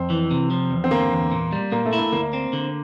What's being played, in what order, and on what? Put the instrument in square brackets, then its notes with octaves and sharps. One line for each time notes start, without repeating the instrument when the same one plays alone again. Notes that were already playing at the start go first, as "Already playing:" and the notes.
Already playing: [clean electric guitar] F2 [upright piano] C4
[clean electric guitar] E3
C3
F3
E2
[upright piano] C4
[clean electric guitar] D3 [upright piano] A#3
[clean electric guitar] E2
A#2
G3
[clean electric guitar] A#2 [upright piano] A#3
[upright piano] A3
[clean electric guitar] E4
[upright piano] A3
[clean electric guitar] D2 [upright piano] A#3
[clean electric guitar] C4
D3